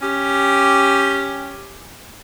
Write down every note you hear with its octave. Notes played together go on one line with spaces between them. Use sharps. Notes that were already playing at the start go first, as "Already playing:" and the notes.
C#4 G4